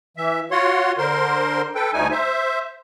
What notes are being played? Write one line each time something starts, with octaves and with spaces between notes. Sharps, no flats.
E3 E5
F4 F#4 C#5 F#5 C6
D3 A#4 C5 C6
A4 B4 G5
D2 G3 A3 D#4 G#5
C5 E5